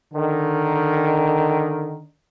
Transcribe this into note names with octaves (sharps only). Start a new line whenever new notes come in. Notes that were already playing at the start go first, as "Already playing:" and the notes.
D3 D#3